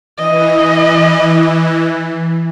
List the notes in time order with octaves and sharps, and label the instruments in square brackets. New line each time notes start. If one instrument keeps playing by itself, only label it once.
[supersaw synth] E3 [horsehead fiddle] D#5